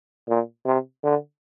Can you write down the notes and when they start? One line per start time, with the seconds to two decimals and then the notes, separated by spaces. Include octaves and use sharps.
0.29 A#2
0.66 C3
1.04 D3